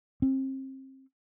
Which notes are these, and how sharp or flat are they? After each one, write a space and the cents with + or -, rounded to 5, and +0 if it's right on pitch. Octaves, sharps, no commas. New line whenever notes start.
C4 +30